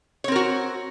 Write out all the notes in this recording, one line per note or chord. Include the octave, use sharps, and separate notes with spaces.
C4 F#4 A#4 C#5